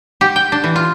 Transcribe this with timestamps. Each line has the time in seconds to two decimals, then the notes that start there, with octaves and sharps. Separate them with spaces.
0.21 G4
0.36 G5
0.52 D4
0.64 E3
0.76 F4